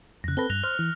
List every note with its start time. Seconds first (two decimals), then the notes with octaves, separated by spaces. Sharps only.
0.24 F2 C#3 F#6 A#6
0.37 C4 A4 B4 A#6 G7
0.50 G2 F#6 A#6 F7
0.64 C5 F6
0.79 E3